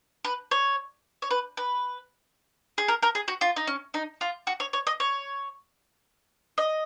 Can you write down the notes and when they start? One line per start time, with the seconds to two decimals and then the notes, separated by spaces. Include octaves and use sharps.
0.24 B4
0.51 C#5
1.22 C#5
1.31 B4
1.57 B4
2.78 G#4
2.88 A#4
3.03 A#4
3.15 G#4
3.28 F#4
3.41 F4
3.56 D#4
3.67 C#4
3.94 D#4
4.21 F4
4.47 F#4
4.60 C#5
4.73 C#5
4.87 D#5
5.00 C#5
6.58 D#5